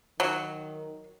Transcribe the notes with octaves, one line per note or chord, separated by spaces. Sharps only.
D#3 F#3